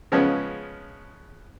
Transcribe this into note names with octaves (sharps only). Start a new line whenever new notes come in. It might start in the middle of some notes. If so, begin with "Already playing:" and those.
C#3 F3 G#3 B3 C#4